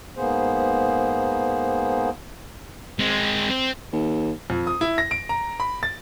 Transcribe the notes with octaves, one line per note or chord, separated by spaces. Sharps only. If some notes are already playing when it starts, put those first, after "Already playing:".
G#2 A#3 B3 G#4 C5
G#3 C4
C4
D#2
F2
D#6
E4
A#6
D7
A#5
B5
A6